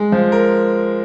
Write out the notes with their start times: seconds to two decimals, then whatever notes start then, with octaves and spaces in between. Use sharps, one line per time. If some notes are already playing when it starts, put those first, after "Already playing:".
Already playing: G#3
0.12 F3
0.32 A#4